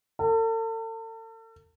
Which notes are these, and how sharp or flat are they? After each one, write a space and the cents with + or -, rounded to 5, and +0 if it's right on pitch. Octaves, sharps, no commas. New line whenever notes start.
A4 +40